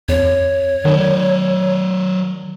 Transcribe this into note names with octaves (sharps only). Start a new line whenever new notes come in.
F2 C#5
D#3 F#3 D5